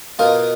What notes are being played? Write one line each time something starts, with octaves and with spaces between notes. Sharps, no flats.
B2 A#3 F4 A#4 D#5